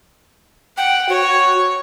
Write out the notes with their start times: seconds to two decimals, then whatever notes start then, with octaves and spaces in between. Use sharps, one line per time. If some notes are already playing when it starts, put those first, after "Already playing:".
0.77 F#5 G5
1.09 F#4 C#5